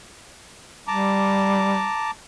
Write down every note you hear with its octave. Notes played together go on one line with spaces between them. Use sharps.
G3 A5 A#5 D6